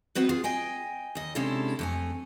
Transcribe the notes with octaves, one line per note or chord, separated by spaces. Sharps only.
G#3 B3 C4 F#4 B4
F4 G#4
D#5 G5 G#5
D#2 D#5
C3 G#3 C#4 D4 E4 A4
F2 A3 G#5